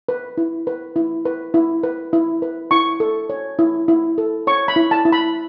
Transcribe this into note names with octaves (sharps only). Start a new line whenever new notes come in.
B4
E4
B4
E4
B4
E4
B4
E4
B4
E4 C#6
A4
C#5
E4
E4
A4
C#5 C#6
B5
E4
A5
E4
B5